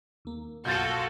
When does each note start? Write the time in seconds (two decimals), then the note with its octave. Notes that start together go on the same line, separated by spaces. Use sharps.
0.25 D#2 A#3
0.65 B1 F#2 B2 F4 F#4 A4 G6 A6